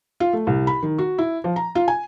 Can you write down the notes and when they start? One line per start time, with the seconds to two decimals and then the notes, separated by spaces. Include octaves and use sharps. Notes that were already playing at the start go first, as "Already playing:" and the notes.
0.20 F4
0.33 A3
0.47 C2
0.67 B5
0.83 D#3
0.98 F#4
1.18 E4
1.44 F3
1.56 A#5
1.75 F4
1.88 G#5